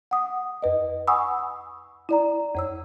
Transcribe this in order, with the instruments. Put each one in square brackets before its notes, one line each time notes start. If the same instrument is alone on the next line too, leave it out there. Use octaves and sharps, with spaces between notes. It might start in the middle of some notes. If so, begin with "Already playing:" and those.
[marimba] F#5 D#6
F2 B4 D#5
F#5 G#5 B5 C#6 D#6 E6
E4 D5 A#5
F2 C#5 E6